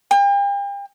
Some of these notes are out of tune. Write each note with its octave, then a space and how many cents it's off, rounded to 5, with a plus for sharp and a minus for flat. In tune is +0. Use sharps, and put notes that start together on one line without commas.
G5 +40